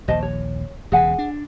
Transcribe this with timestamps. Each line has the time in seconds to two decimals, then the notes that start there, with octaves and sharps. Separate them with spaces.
0.08 A#1 D#2 C5 D#5 A5
0.23 C#5
0.92 E1 E2 C#3 G#4 F#5 G#5
1.18 D4